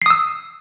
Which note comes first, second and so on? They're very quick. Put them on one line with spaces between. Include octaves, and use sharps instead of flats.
C7 D#6 E6